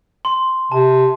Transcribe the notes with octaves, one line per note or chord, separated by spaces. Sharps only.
C6
C3 A5